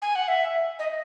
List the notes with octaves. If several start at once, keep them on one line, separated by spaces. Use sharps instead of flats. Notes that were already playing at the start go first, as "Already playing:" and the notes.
G#5
F#5
E5
D#5